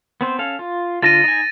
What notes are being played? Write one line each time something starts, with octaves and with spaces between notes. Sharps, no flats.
B3 C4 C5
C#4 A4 F5
F4
D3 F4 A5 A6 A#6 D#7
D#4 G#5